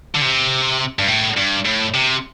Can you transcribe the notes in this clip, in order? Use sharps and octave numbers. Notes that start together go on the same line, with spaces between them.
D3
C3
G2
A2
G2
A2
C3